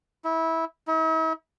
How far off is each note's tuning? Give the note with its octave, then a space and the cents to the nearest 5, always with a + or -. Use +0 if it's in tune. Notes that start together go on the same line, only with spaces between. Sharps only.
E4 -20
E4 -45